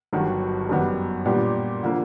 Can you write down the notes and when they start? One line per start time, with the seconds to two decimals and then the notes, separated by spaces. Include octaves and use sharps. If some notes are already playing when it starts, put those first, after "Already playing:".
0.13 G1 G2 D#3 F#3
0.69 F#2 D#3 G3 B3
1.26 A#2 G3 B3 D4 G4
1.83 D3 F3 A#3